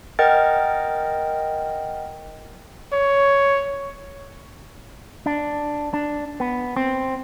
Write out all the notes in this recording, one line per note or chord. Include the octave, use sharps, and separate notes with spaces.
A#4 D#5 F#5 G5 F6 A6
C#5
D4
D4
B3
C4